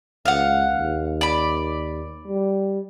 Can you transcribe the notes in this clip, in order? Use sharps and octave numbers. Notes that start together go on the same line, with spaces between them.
C#2 F5 F#5
D#2
D5 B5
G3